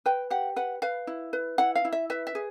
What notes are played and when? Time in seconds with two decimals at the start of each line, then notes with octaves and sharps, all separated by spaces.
0.06 B4 G5
0.30 G4 F#5
0.56 B4 F#5
0.82 B4 F5
1.07 E4
1.33 B4
1.58 E4 F#5
1.75 F5
1.85 E4
1.93 E5
2.10 B4 E5
2.27 E5
2.35 G#4